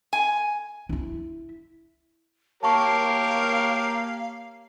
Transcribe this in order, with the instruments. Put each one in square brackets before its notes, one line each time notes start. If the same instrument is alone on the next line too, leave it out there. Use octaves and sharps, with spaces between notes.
[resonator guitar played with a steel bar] G#5
[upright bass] D#4 E4
[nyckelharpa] A#3 [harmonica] G4 A#4 C#5 [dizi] F5 [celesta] A5 C#6